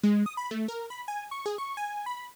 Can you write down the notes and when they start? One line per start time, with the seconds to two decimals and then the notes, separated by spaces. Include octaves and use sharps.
0.03 G#3
0.26 D#6
0.37 B5
0.51 A3
0.68 A#4
0.90 B5
1.08 G#5
1.31 C#6
1.46 G#4
1.58 C#6
1.77 G#5
2.06 B5